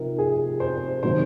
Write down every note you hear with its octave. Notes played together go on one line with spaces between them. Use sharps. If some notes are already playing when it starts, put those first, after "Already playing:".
Already playing: C3 F3 C4 D#4 A#4
G#4
C5
C3 D#3 F#3 C5